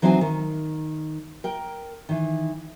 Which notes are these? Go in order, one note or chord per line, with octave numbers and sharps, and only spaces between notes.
E3 F#3 C4 D#4 G5 G#5
D#3
A#4 G5
D#3 E3